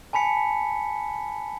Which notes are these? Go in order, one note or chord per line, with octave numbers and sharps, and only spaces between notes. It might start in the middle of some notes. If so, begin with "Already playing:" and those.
G#5 A5 B5 B6 C#7